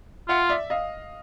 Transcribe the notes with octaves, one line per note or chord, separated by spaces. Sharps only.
F4 E5 F#5
D5 E5
D#5 F5